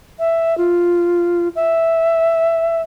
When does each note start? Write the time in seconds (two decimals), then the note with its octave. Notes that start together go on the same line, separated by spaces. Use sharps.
0.19 E5
0.58 F4
1.56 E5